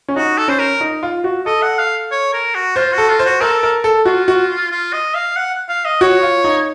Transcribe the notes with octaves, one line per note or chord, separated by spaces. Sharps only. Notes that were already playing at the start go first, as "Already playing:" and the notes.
C#4
D#4 F#4
A4
C#4 C5
A#4
D#4
F4
F#4
A4 D#5
F#5
F5
C#5
A#4
F#4
F4 C5
F#4
A4
F4
C5
F#4
A4 A#4
A#4
A4
F4 F#4
F#4
F4
D#5
F5
F#5
F5
D#5
F#4 C#5
F4
D#4